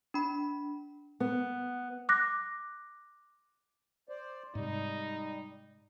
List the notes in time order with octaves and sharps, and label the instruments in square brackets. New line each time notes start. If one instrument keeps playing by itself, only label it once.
[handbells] D4 B5
[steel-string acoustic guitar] B3
[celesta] D6 F#6 A#6
[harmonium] C5 D5
[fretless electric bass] G#2 C3 [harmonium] G3 [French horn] D#4